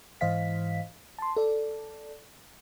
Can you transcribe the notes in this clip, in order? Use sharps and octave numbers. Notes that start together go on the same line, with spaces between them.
G#2 E3 C5 D#5 F5 B6
A5 C6
A4 D5